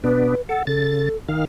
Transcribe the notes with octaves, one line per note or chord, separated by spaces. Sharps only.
B2 B3 D4 B4
A4 F#5
C#3 A4 A6
D#3 F5